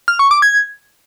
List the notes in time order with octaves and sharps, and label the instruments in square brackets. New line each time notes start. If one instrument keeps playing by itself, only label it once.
[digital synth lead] F6
C#6
D6
G#6